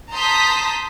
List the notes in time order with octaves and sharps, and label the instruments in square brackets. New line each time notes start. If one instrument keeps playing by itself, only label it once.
[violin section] A5 A#5 C6 D#6 G6 B6